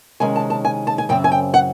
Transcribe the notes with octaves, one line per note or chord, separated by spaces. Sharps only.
C3 D#3 G#3 C#4 G#5
A5
A5
G#5
A5
G#5
F#2 C#3 C4 G5
G#5
G5
F#5